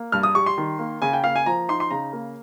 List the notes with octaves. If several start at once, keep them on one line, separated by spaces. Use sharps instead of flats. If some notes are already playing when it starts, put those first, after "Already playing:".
Already playing: A#3
G2 F6
D#6
G3 C#6
C6
D#3
A#3
C#3 G#5
G5
A#3 F5
G#5
F3 A#5
D#4 C6
C6
C#3 A#5
A#3